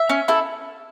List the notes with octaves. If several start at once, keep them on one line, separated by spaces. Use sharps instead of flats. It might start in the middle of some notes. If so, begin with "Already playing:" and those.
Already playing: E5
C#4
E4 A4